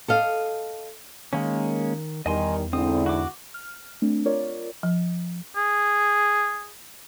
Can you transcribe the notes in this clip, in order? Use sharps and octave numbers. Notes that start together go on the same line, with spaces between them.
A4 D#5 F5
D#3 G#3 A#3 C#4
E2 D#3 G3 D#5 G#5 C6
G#2 D3 C4 E4 D#6
F#4 D6
F6
A3 C4 D4
F4 A#4 C#5 D5
F3
G#4